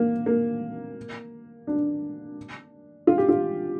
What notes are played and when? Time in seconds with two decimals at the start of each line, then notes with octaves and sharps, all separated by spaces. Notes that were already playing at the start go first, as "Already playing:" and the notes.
Already playing: A#3
0.26 A#3
1.67 D4
3.07 F4
3.18 G4
3.29 F4